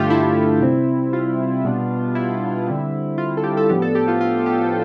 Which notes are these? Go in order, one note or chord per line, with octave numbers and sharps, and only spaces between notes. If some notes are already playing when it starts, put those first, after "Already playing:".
Already playing: G2 D3 A3 D4 F4 G4 A4
E4
C3 G3 C4
F4
B2 G3 B3 D4
E4
D3 G3 C4
F4
A4
G4
A4
A2 F3 B3 D4 G4
A4
G4
F4
F4
G4